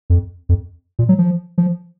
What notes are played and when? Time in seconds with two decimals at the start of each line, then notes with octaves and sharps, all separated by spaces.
0.10 F2
0.49 F2
0.99 A#2
1.09 F#3
1.18 F3
1.58 F3